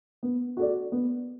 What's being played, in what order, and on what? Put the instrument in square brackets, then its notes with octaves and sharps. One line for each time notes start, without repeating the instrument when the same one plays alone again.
[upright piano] B3
F#4 A4 D5
B3